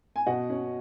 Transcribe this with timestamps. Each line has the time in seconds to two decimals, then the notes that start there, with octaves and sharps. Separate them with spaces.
0.16 G#5
0.27 B2 D#5 F#5
0.49 C#4